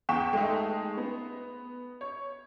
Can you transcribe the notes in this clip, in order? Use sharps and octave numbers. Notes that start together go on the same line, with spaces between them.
E2 G5 C#6 B6 E7
G#3 A3 D#4
B3
C#5